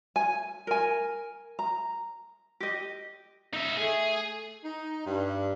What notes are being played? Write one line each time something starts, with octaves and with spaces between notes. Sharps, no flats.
G#5
A#4 G#5
A#5
G4 D#5
D#4 E5
A3 G#4
D#4
G2